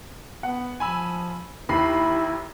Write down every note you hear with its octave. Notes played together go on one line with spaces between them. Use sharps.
B3 F#5
F3 G#5 B5 E6
D#2 E4 B5 C7